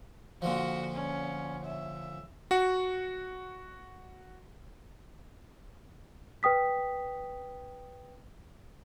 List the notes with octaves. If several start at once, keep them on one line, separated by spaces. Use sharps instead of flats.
A#2 D3 F3 F#4
C#4
E5
F#4 F#5
B4 G5 D#6 B6